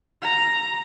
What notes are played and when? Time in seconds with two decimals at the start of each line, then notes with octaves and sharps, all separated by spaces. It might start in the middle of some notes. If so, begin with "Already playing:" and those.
0.23 A#5